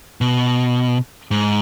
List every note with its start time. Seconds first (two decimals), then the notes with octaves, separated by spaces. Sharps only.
0.21 B2
1.31 G#2